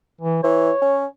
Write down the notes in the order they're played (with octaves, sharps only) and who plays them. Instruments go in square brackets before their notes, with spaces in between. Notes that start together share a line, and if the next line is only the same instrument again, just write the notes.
[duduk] E3
[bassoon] E3 [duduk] C#5
[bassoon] C#4